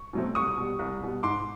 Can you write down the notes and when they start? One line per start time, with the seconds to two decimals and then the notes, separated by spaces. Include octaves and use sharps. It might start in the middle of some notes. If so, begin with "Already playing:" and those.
Already playing: C#6
0.13 B2 F#3 A3 C4
0.35 C2 C#6 D#6
0.57 B2 G3
0.79 C2
1.01 B2 G3
1.23 G#2 C6 D6